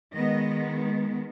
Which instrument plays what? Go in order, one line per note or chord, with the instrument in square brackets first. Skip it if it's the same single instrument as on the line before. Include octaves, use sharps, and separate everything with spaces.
[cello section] D#3 G#3 B3 D#5